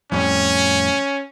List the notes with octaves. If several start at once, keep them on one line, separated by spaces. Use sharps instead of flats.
F2 A2 G3 C#4